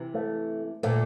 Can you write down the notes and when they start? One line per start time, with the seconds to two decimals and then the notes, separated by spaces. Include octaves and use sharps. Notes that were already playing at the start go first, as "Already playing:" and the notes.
Already playing: C3 E3
0.14 A3
0.83 A#2 D3 A3